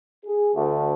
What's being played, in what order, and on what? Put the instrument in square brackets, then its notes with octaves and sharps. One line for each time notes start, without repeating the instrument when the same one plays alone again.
[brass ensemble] G#4
D2